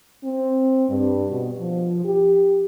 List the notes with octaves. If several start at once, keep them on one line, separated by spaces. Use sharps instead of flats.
C4
G2
B2
F3
G4